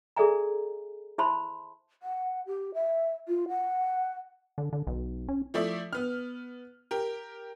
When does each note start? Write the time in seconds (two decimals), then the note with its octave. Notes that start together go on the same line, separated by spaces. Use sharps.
0.16 G#4 A4 D5 E5 G#5 A#5
1.18 E4 C5 E5 A5 B5 C6
2.03 F#5
2.47 G4
2.74 E5
3.28 F4
3.49 F#5
4.58 D3
4.73 D3
4.87 B1
5.29 C#4
5.54 F3 A3 E4 D5 E5
5.93 B3 F6
6.91 G4 A#4